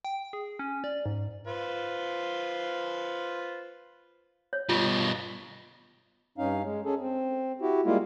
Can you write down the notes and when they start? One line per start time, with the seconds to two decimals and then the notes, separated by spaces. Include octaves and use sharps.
0.05 G5
0.33 G#4
0.59 C#4
0.84 D5
1.06 G#2
1.47 F4 B4 C5
4.53 C#5
4.69 G2 B2 F4
6.38 G2 C#4 D#4 F5
6.63 G#3
6.85 C#4 G#4 A4
7.00 C4
7.62 E4 F#4 G4
7.85 G3 G#3 A#3 E4 F4